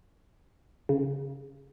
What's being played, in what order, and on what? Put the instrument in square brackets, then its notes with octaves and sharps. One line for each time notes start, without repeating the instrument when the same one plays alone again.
[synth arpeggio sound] C#3